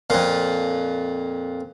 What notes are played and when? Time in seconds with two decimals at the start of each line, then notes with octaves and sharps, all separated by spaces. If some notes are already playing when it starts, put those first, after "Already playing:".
0.10 F2 A#2